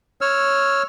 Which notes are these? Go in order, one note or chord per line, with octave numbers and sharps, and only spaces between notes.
C#5 E6 F6